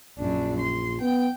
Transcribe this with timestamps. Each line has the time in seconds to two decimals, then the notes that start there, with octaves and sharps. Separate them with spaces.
0.18 A#1 F#2 D4
0.59 C6
1.01 B3 G5